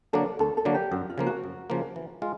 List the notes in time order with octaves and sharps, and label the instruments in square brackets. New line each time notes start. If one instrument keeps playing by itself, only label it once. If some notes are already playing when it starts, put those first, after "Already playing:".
[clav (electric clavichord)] D3 F#3 A#3 D4 [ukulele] A4
[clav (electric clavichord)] D2 [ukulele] A4
[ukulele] A4
[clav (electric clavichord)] D3 F#3 A#3 D4
[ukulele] G4
[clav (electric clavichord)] F#2 [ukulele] F#4
[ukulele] F4
[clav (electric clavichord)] C#3 F3 A#3
[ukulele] F#4
[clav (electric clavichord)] F#2
C#3 F3 A#3
E3
G#3 F4